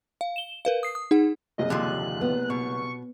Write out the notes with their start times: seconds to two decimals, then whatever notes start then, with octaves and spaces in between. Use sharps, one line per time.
0.21 F5
0.36 E7 G7
0.65 A#4 B4 F5
0.83 D#6 C7
0.95 D#6
1.11 D#4 G#4 F#5
1.58 F#1 C2 G#4 D#5
1.70 D#2 D3 F3 F#6
2.21 B3
2.50 B2 C#6